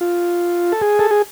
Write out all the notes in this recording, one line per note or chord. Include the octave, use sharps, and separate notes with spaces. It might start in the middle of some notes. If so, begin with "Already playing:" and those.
F4
A4
G#4
A4
G#4